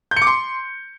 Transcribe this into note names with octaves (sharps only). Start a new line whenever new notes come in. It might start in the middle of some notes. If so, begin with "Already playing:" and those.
G6
C#7
D6
C6